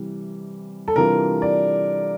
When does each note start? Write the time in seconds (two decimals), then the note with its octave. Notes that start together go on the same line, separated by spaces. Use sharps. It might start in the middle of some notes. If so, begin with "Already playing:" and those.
Already playing: C3 E3 G3
0.88 A4
0.96 C3 E3 G3 D4 F4 A#4
1.42 D5